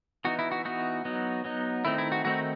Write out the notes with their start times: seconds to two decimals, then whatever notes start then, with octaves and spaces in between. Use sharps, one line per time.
0.25 E3 B3 D#4 F#4
0.39 E4
0.52 F#4
0.65 E3 B3 D#4 F#4
1.05 F#3 B3 D#4
1.45 F#3 B3 D#4
1.85 D#3 A3 C4 D#4 E4
1.98 E4
2.12 F#4
2.24 D#3 A3 C4 D#4 F#4